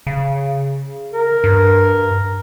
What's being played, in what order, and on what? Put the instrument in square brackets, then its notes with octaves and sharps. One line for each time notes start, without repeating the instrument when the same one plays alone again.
[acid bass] C#3
[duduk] A#4
[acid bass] G2